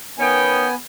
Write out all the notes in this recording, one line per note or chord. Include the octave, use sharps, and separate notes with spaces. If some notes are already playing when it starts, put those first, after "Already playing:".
D#3 B3 C#4 G5 G#5